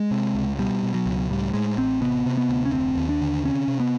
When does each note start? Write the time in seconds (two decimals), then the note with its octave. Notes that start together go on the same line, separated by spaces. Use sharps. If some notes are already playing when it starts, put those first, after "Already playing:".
Already playing: G#3
0.11 C3
0.35 C#2
0.59 B2 G3
0.83 B2
0.94 F#3
1.06 C#2
1.30 A2 G3
1.54 A2 G#3
1.78 A1 C4
2.01 C3 B3
2.26 C3
2.37 B3
2.49 D2
2.65 C#4
2.73 F1 C4
2.97 D#2
3.09 D4
3.21 D3
3.44 C3 C#4
3.68 C3
3.80 B3